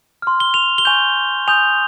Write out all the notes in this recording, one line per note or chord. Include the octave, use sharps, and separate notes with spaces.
C6 F6
G7
F7
G7
G#5 C#6 G6 F7
G#5 D#6 G6 F7